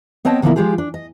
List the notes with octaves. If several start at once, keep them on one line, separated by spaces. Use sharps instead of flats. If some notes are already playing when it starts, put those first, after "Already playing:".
B3 C4 C#5 D#5 G5 A5
A#2 D3 F3 G#3 A#3 E4
F3 G#3 F4 G4 G#4
D4
D#5